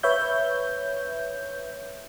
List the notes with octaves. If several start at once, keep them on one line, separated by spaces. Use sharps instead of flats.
B4 C#5 E5 G6